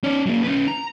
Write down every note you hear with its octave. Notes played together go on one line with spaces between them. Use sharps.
C#4 D5
F#3 A#3
C#4 B4
A#5